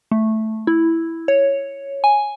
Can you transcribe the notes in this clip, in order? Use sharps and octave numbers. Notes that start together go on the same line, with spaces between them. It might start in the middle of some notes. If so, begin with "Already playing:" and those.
A3
E4
C#5
G#5